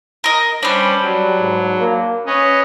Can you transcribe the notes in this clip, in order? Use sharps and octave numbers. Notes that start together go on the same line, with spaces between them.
A#4 D#5
G3 C#4 D4 B4 C5
F#3 G3
G#2
A#3
C#4 B4 C#5 D#5